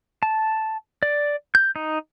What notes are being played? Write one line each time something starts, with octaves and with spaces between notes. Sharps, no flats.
A5
D5
G6
D#4